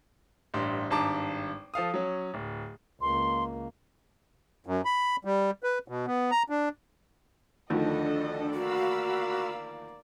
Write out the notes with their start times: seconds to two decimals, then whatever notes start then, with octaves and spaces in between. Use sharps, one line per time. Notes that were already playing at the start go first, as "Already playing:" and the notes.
0.54 A1 G2 C6
0.90 G#1 G2 A5 A#5 D6
1.74 F3 A4 F5 D#6
1.94 F#3 C#4
2.34 D1
3.01 C#2 A#3 C6
4.66 F#2
4.85 B5
5.25 G3
5.63 B4
5.88 B2
6.07 B3
6.31 A#5
6.50 D4
7.70 D2 D#3 F3 D4 A4 D#5
8.54 A#3 F#4 D5 F5 B5 E6